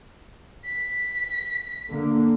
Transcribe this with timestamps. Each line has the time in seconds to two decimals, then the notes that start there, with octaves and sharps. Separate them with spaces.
0.65 B6
1.90 D3 A#3